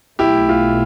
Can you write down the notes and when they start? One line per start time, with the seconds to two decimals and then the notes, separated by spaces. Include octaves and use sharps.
0.19 B1 B2 A3 E4 G4
0.49 F4